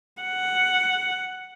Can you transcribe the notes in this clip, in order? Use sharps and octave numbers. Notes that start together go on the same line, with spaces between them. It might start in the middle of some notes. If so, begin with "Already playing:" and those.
F#5